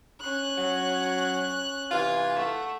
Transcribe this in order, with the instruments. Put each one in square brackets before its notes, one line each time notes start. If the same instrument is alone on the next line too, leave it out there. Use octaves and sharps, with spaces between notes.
[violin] C#4 F#6
[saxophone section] F#3
[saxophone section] C3 E3 F4 [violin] G#5
[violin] A3 F#5